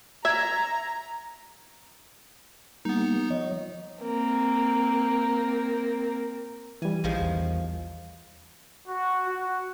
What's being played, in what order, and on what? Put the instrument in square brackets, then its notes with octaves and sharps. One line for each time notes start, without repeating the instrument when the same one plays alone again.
[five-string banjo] E5 [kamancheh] A#5 [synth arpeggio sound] G#6
[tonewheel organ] G3 A#3 [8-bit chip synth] B3 D#4
[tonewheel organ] F3 C#5 D#5
[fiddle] A#3 C4
[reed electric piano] E3 G3 [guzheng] G#5
[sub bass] A#1 [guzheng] D#3 F3 G#3
[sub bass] E2
[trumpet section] F#4
F#4